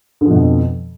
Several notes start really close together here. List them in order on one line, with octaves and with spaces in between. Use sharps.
D3 F3 B2 F2